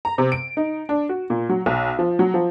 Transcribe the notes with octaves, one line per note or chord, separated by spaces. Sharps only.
A#5
C3
D7
D#4
D4
F#4
A#2
F#3
B1
F3
F#3
F3